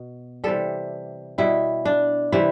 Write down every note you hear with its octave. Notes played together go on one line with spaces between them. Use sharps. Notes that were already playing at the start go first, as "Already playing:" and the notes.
Already playing: B2
C3 E3 G3 A4
B2 G3 E4
D4
C3 E3 G3 E4